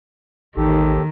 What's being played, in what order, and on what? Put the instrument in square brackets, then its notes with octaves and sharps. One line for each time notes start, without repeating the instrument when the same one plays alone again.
[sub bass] A1 [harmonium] D#2 G4 A4 [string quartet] D#3 [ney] D#4